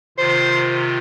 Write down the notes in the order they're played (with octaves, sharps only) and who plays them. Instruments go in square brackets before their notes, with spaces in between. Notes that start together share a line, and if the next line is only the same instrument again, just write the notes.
[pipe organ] C3 D#3 F4 [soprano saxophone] C5